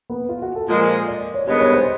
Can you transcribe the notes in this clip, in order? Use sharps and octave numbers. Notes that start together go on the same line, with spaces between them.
B3
F4
F#4
A4
A#2 F3 G#3
D5
C#5
G2 D#3 G#3 B3 C#5
C#5
C5